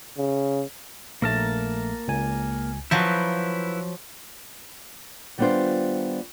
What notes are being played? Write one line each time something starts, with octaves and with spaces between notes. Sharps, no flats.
C#3
A#1 A3 A#3 A#4 A5
C#2 G#5
F3 F#3 E4 B4 G6
D#3 G3 B3 D4 F4 C5